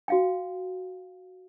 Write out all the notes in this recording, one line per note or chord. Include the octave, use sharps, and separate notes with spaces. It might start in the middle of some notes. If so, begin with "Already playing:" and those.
F#4 F5 G5